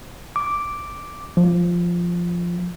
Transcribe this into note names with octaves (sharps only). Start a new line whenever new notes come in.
D6
F3